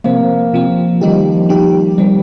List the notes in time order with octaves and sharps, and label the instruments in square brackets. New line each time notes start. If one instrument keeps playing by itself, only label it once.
[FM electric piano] C3 F3 C4 [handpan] A#3
[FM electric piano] C3 F3 C4
[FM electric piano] D#3 G3 D#4 G4 [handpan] F3
[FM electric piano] D#3 G3 D#4 G4
[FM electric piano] D#3 C4 [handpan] G3